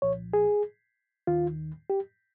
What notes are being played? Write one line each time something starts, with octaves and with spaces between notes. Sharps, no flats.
C2 A#2 F3 C#5
G#4
D#2 D#3 F4
G4